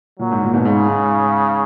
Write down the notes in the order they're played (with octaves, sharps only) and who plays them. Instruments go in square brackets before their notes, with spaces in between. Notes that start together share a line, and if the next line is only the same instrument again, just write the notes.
[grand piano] A#2 [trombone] F#3
[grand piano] G#2
A#2
G#2 B2
[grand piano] G#2 [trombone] C#3
[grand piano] G#2